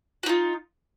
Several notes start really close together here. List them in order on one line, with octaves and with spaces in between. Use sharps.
F#4 D#4 F4